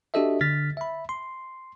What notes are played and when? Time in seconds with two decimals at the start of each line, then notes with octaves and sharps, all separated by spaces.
0.14 D4 F#4 G4 A4 D#5 E5
0.41 D3 F6 A6 B6
0.77 E5 B5
1.09 C6